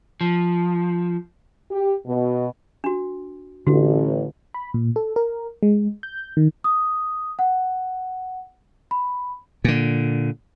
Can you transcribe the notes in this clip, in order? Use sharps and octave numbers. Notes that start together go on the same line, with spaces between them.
F3
G4
B2
D4 F#4
A1 D3 D4 F#4
B5
A#2
A4
A#4
G#3
G6
D#3
D#6
F#5
B5
A#2 D3